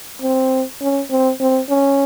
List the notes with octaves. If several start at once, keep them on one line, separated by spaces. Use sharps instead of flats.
C4
C#4
C4
C4
C#4